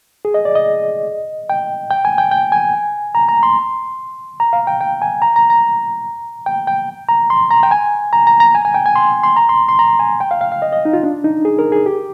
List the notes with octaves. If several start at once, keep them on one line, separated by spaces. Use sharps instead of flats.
G#4
D#5
D5
D#5
G5
G5
G#5
G5
G5
G#5
A#5
A#5
C6
A#5
F5
G5
G5
G#5
A#5
A#5
A#5
G5
G5
A#5
C6
A#5
G5
G#5
A#5
A#5
A#5
G#5
G#5
G5
G#5
C6
C6
A#5
C6
C6
A#5
G#5
G5
F5
F5
F5
D#5
D#5
D#4
F4
D4
D#4
G#4
A#4
G#4
G4